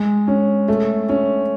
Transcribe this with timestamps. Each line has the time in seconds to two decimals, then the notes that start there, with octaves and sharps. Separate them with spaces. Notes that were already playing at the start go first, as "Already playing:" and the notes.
Already playing: G#3
0.28 C#4
0.68 A3
1.09 C#4